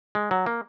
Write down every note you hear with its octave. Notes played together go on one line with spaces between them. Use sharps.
G#3
F#3
A#3